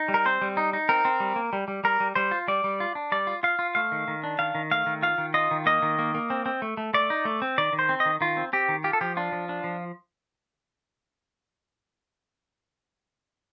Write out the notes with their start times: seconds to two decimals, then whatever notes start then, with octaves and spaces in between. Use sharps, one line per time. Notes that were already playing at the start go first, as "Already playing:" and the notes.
Already playing: D#4
0.08 G3
0.14 A#4
0.25 C4 C5
0.42 G3
0.57 D#4
0.73 D#4
0.89 C4 A#4
1.05 C4
1.20 G3
1.36 A#3
1.53 G3
1.68 G3
1.84 G3 A#4
2.00 G3
2.15 G3 C5
2.31 F4
2.48 G3 D5
2.64 G3
2.80 F4
2.95 D4
3.12 G3 D5
3.27 F4
3.43 F4 F5
3.59 F4
3.75 A3 F5
3.92 D#3
4.08 D#3
4.24 D4
4.39 D#3 F5
4.55 D#3
4.71 A3 F5
4.86 D#3
5.03 F4 F5
5.18 D#3
5.34 F4 D#5
5.51 D#3
5.66 A#3 D#5
5.82 D#3
5.99 A#3
6.15 A#3
6.30 C4
6.46 C4
6.62 A3
6.77 A3
6.94 A3 D5
7.10 D#4
7.25 A3
7.42 C4
7.58 D#3 D5
7.73 D#3
7.79 C5
7.89 C4
8.00 D#5
8.06 D#3
8.21 D#3 F4
8.37 C4
8.53 C4 G4
8.68 D#3
8.84 F4 G4
8.93 A4
9.01 F3 G4
9.17 D4 F4
9.32 F3
9.49 D4
9.64 F3